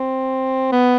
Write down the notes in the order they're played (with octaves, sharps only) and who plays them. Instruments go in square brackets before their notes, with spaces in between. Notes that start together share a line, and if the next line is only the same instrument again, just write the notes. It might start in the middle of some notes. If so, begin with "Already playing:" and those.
Already playing: [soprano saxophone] C4
B3